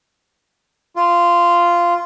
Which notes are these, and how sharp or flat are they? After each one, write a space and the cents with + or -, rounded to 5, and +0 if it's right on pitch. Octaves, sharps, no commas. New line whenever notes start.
F4 -10